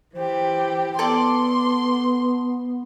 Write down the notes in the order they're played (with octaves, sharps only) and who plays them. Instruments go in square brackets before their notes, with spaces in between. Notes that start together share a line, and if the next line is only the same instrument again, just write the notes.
[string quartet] E3 G4 [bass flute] C5
[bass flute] B3 [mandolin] A4 D5 [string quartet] C6